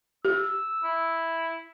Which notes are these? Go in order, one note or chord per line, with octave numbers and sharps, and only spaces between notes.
G4 E6
E4